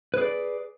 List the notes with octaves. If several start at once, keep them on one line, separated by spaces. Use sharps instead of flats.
G#4 B4 D5